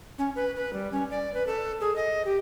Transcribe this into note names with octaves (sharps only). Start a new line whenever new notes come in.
C#4
B4
B4
G3
C#4
D5
B4
A4
G#4
D#5
G4